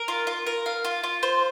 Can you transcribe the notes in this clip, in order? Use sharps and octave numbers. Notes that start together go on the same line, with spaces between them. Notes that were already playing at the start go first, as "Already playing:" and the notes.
Already playing: A#4
F4
F4
A#4
F5
F4
F4
C5